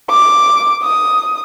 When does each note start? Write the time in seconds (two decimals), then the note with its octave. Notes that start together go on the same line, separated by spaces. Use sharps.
0.10 D6
0.83 D#6